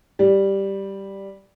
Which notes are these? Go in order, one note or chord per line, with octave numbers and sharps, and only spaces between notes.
G3